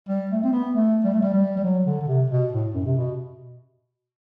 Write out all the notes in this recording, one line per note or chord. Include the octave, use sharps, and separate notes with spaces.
G3
A3
C4
B3
A3
G3
A3
G3
G3
G3
F#3
D3
D3
C3
B2
A2
F#2
C3
B2